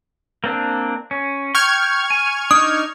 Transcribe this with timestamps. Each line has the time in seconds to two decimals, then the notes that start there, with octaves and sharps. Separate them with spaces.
0.44 A#3 C4 D4
1.11 C#4
1.55 G5 C#6 F6 G#6
2.10 G#5
2.51 D4 D#4 D#6